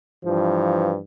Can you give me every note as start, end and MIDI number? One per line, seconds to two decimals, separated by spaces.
0.24 0.98 43
0.24 0.98 52
0.24 0.98 53